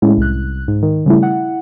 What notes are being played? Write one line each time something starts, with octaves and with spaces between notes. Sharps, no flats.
A2 G#3 C#4 E4
C2 F#6
G#2
D#3
C#3 G3 A3 E4
E4 F#5